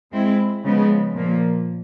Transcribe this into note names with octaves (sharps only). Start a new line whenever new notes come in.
G#3 C4 E4
C#3 F3 G#3 B3
A#2 F3 A#3